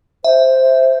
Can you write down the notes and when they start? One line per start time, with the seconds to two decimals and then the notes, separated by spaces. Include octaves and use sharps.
0.24 C5 E5